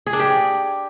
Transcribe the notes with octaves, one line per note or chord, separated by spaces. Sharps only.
G#4
D4
G4